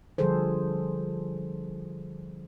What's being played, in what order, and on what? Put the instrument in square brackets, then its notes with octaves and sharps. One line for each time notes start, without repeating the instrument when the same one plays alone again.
[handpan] D3 F3 G3 G#4 A4 C5